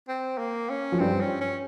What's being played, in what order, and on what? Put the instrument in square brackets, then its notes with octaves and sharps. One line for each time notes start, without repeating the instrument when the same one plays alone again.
[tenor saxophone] C4
A#3
C#4
[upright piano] F3
[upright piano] G2 G3 [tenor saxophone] C4
[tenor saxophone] C#4
C#4